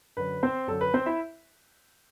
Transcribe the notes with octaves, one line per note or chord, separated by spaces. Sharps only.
F#2 D3 B4
C4 C5
F#2 D3 A4
B4
C4 C5
E4 E5